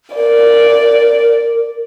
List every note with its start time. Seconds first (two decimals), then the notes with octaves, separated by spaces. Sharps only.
0.16 A#4 D5